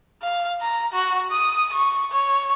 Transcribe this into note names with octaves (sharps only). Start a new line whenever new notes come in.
F5
A#5
F#4
D#6
C#6
C#5